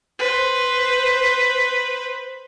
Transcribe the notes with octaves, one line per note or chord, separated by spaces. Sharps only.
B4 C5